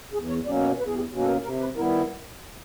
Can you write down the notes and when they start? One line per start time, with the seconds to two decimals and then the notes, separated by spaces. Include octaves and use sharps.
0.13 E2 G#4
0.29 C#5
0.46 B2 F#3 A#3 C#4 D5
0.62 C#5
0.78 E2 B4
0.87 G#4
0.95 G4
1.10 B2 F#3 A#3 C#4
1.22 A4
1.28 A#4
1.43 C3 A#4
1.60 B4
1.76 D#3 G3 B3 E4 A#4